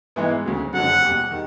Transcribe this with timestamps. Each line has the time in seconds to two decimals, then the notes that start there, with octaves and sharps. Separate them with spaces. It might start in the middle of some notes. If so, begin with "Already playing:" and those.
0.16 G#2 E3 G#3 B3 E4
0.45 D2 C#3 F#3
0.73 F#1 F2 D3 F#3 F#5
1.02 E2 B2 G3
1.31 D#3 G3